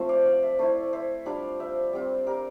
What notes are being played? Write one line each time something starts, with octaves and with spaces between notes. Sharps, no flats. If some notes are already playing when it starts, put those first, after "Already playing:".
Already playing: F3 A3 C4 F4 C5
D5 F5
D5 F5
C5 E5
A3 E4 A4 C5
C5 E5
G3 D4 F4 D5 F5
C5 E5
G3 C4 F4
G4 A#4